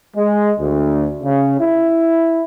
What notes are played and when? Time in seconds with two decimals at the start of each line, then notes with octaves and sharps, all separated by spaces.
0.16 G#3
0.59 D2
1.22 C#3
1.59 E4